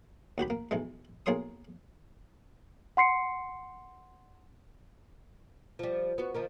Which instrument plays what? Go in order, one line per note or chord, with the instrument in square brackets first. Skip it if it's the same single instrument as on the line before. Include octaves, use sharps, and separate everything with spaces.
[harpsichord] D#2 F#4 G4 B5
A#3
B1 E3 G#3
B1 A#3 G#4 C#5 C6 D#6
[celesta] F#5 C6 C7 C#7
[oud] F3 G3
B3 F#4
D#3 F3 A#3